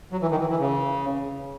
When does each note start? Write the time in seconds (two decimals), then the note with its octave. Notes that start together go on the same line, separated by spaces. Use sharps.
0.12 F#3
0.22 E3
0.31 D#3
0.40 E3
0.50 E3
0.60 C#3